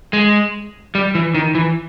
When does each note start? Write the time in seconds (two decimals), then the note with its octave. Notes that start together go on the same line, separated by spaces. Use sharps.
0.13 G#3
0.95 G3
1.15 E3
1.35 D#3
1.55 E3